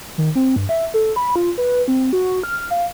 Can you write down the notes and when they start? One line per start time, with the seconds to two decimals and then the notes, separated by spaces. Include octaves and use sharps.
0.18 D#3
0.35 C4
0.56 G2
0.69 E5
0.94 A4
1.16 B5
1.36 F4
1.58 B4
1.88 C4
2.13 F#4
2.44 F6
2.71 F5